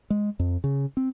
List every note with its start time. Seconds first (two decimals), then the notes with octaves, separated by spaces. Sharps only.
0.10 G#3
0.39 F2
0.64 C#3
0.97 C4